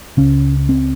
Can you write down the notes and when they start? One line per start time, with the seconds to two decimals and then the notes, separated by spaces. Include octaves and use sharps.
0.17 C#2 C#3 C#4
0.69 C4